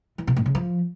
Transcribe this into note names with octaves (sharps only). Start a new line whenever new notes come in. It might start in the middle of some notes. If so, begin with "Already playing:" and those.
E3
B2
A2
C#3
F3